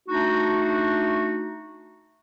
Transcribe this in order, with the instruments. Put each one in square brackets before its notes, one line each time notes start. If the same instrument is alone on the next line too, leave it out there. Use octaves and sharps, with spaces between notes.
[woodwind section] A3 D4 D#4 F#4